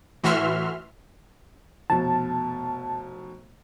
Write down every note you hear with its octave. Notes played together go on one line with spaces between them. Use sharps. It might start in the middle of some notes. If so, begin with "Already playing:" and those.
A2 E3 F#4 E5 C6 F6
F1 B2 A5